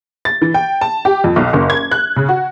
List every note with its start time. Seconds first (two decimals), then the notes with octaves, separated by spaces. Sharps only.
0.25 A6
0.42 E3
0.54 G5
0.81 A5
1.05 G4
1.24 F2
1.36 B1
1.53 F#1
1.70 G#6
1.91 F#6
2.16 C#3
2.29 F#4